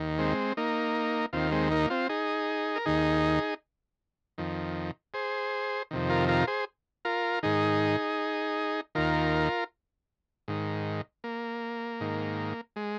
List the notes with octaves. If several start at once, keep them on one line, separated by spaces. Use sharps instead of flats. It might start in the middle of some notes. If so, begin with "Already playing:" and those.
Already playing: D#2 D#3
G#3 C4
A#3 D#4
D#2 D#3 C4 F4
G#3 C4
A#3 D#4
C4 F4
D#4 G#4
A#4
D#2 D#3 D#4 G#4
F2 D#3
G#4 C5
F2 C3 D#3
F4 A#4
F4 A#4
G#4 C5
F4 A#4
G#2 D#3 D#4 G#4
D#2 D#3 F4 A#4
G#2 D#3
A#3
G#2 D#3
G#3